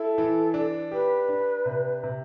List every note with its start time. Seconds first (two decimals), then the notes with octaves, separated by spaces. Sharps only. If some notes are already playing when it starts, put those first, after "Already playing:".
Already playing: E4 A4
0.18 E3
0.54 D4
0.91 G4 B4
1.29 D4
1.66 C3
2.03 C3